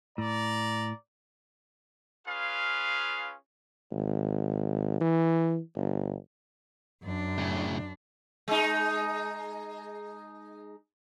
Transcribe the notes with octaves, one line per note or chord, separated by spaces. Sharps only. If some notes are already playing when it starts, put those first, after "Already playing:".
A2 D5 A#5
C#4 F4 G#4 B4 F5
G#1
E3
G1
F#2 D4
A2 C#3
G#3 D#4